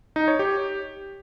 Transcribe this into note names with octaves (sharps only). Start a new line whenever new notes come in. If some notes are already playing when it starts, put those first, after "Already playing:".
D#4
C#5
G4